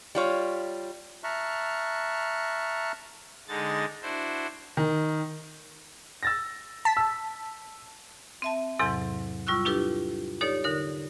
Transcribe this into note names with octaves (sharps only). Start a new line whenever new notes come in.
G3 F4 C#5
E5 A5 A#5 C#6 F6 F#6
D3 G#3 D#4 A6
D4 E4 F#4 C5
D#3
E6 A6 A#6
A5 B6
E6
C4 E5 A5
E2 G#2 C3 F#3 A4 A6
G3 F4 C#6 E6 F#6
D4 E4 F4 G4 A4 B4
D#4 G4 A4 C#5 D5
D3 D#4 A#4